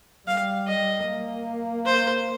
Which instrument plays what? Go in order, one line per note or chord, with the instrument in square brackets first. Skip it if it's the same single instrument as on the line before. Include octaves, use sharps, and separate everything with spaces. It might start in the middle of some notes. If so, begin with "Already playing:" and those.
[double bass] G3 [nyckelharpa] F5
[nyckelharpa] D#5
[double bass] A#3
[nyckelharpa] C5